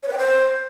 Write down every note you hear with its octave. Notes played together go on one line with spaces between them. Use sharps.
C#5
B4
G5
C5